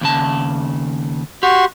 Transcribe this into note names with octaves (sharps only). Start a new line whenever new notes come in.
D#2 C#3 A5
F#4 G4 C6 C#6